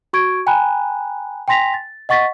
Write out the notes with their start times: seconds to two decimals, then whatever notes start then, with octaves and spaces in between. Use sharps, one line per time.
0.13 F#4 C#6 G#6 D7
0.47 G5 G#5 A#5 B5 F#6
1.48 G5 G#5 C6 A#6 B6 F7
1.74 A6
2.09 D#5 F#5 C#6 A6 B6